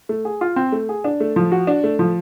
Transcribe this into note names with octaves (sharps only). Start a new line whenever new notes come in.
A3
G#4
F4
C4
A3
G#4
D4
A3
F3
F#4
D4
A3
F3